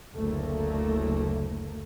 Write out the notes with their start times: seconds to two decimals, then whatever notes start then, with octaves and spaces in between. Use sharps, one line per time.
0.16 F#1 D2 A3 A#3